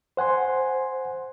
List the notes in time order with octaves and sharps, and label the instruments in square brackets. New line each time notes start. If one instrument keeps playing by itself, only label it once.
[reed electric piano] C5 F#5 G#5 C6